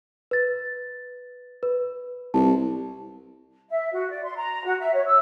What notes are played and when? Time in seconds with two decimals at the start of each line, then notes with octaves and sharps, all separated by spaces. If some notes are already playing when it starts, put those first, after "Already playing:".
0.31 B4 A6
1.63 B4
2.34 C2 A5
3.69 E5
3.92 F#4
4.10 D5
4.24 C6
4.36 A#5
4.64 F#4
4.80 E5
4.93 C#5
5.06 E6